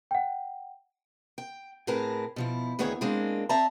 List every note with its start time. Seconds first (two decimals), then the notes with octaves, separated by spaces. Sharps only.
0.11 F#5 G5
1.38 G5
1.87 A2 C4 G#4 A#4 B4 A5
2.36 B2 F3 E4
2.79 D2 D#3 B3 E4 G#4 C#5
3.01 G#2 G#3 A#3 C4 D4
3.49 C4 D5 E5 A5 A#5